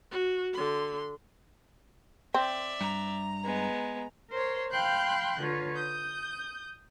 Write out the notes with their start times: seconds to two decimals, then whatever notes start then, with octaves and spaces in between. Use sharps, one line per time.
0.11 F#4
0.54 D3 C6
2.34 C4 D5 E5
2.81 G2 A#5
3.44 G#3 B3
4.31 A#4 C5 C#5 C6
4.70 F5 G5 B5 C6 F#6 G6
5.41 D3 F4 B4 C#5
5.75 D#6 G6